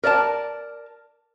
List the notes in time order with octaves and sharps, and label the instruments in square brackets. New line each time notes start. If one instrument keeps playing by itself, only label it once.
[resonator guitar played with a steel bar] A#4 D5 D#5 A5